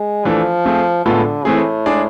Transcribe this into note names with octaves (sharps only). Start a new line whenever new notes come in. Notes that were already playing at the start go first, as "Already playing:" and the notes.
Already playing: G#3
E3 F3 A3 D4 A4
A3 C4 G#4 C5
A2 D3 G#3 B3 F4 A4
A2 E3 A3 C4 G#4
G#3 D4 G#4 D5